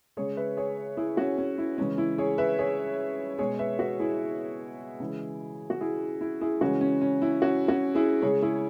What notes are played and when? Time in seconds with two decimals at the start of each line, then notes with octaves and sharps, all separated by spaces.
0.17 C#3 G#3 G#4 C#5
0.37 B4 E5
0.57 G#4 C#5
0.97 E4 G#4
1.17 C#4 F#4
1.38 C#4
1.58 E4
1.78 C#3 E3 G#3 C#4
1.98 E4
2.18 G#4 C#5
2.38 B4 E5
2.59 G#4 C#5
3.39 B2 G#3 G#4 C#5
3.59 B4 E5
3.79 F#4 B4
3.99 E4 G#4
5.00 C#3 E3 G#3
5.70 F#4
5.80 E4 G#4
6.21 E4
6.41 E4 G#4
6.61 C#3 E3 G#3 C#4 F#4
6.81 C#4
7.01 C#4
7.22 E4
7.42 C#4 F#4
7.68 C#4 F#4
7.95 E4 G#4
8.22 C#3 G#3 G#4 C#5
8.42 E4 G#4